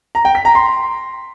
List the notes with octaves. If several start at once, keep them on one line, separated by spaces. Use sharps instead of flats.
A#5
G5
B6
A#5
C6